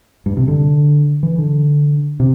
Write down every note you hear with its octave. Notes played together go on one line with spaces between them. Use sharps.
G2
C3
D3
E3
D3
C3